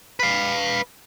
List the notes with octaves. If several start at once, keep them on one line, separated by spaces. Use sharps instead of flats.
B4 F5